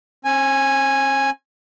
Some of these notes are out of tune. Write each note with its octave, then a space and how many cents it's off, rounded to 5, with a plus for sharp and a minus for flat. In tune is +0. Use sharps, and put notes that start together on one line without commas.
C4 +45 G#5 -5